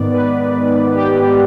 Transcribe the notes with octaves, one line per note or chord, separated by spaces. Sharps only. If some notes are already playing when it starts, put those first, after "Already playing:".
Already playing: G#2 D#3 B3 D5
B4
G4